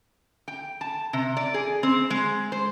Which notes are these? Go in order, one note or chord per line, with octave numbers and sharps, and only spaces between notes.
G5
A5
C3
D5
G#4
C4
G#3
C5